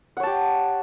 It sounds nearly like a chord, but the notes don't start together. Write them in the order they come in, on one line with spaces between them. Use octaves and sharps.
F#5 C#5 A5 G4